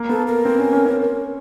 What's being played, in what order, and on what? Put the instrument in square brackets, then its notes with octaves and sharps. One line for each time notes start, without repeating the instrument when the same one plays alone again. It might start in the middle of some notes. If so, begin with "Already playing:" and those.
Already playing: [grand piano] A#3
[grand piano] B3 [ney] A4
[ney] A#4
[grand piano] C4
C#4
C#4
C#4